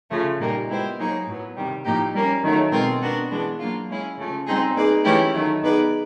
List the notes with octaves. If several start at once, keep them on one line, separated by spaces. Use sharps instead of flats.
C#3 F3 A3
A#2 G3 A#3 D#4
G#3 B3 E4 G4 C5
F#3 A#3 D#4 G#4 C#5
A2 F#3 B3
C3 D#3 G3
A2 F3 A#3 D#4 G4
G3 A#3 C#4
D#3 F#3 A3
B2 G#3 C4 F4 A#4
B3 D4 F#4 A#4
E3 G#3 B3 D4
F#3 A#3 D4 F4
G#3 C#4 E4 G#4
C#3 F3 A3 C#4
G3 C4 D#4 G#4
A#3 D#4 G#4 B4 D5
E3 A3 C#4 E4 G4
D#3 F#3 A3
B3 D#4 G#4 B4 D5